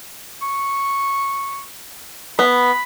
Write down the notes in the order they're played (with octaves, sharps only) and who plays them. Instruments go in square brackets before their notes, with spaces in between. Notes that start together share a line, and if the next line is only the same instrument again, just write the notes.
[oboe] C#6
[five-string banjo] B3 [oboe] B5